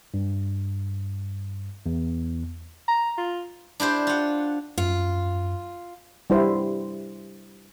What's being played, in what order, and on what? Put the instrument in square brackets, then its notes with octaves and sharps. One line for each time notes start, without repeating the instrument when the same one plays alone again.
[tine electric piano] G2
E2
[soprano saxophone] A#5
F4
[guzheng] D4 E4 G4 C5
F4 F#5
[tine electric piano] F#2 [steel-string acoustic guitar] F4
[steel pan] G3 E4 C5